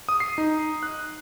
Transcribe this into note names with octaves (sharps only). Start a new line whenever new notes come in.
D#6
C7
D#4
F#6